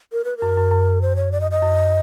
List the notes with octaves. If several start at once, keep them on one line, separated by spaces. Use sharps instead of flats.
A#4
B4
F#2 A#4
F#2
F#2
C5
C#5
D5
D#5
D#5
F#2